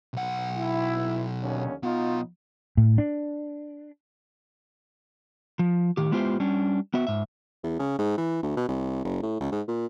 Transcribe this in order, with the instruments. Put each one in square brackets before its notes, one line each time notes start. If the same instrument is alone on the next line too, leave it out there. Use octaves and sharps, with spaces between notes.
[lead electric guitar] B1 F#5
[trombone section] E4
D#2 D3 C#4
[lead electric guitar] B1 B3 [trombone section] D#4 F4
[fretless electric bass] A2
D4
[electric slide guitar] F3
A2 D#3 G4
G#3 B3 E4 F4 G4 C5
G3 C#4 D4
B3 F#4 E5
G#2 E5
[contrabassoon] E2
C#3
G#2
E3
D2
B2
C2
F#1
A2
C#2
G#2
A#2